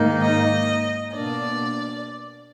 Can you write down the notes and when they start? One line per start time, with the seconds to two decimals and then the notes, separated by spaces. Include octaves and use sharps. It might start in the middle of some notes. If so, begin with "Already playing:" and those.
Already playing: G#2 D#3 A#3 D#4
0.21 D#5
1.14 B2 A#3 D4 D5